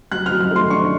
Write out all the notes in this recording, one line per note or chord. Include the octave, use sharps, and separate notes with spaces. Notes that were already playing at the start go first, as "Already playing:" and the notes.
F#3 F#6
F6
F#3
F6
A3 C6
D4 C#6